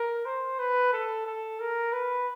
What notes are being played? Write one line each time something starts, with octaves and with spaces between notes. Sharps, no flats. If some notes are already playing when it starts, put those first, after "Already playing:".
Already playing: A#4
C5
B4
A4
A4
A#4
B4